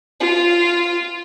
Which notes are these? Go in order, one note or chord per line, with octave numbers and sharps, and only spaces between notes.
F4